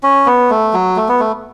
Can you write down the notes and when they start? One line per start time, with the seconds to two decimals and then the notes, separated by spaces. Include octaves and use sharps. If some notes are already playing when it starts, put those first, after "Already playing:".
0.03 C#4
0.26 B3
0.50 A3
0.73 F#3
0.96 A3
1.08 B3
1.20 A3